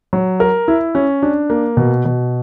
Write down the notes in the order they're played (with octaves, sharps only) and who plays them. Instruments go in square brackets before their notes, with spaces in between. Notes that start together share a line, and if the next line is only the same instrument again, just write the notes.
[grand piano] F#3
A#4
E4
C#4
D4
A#3
B2
B2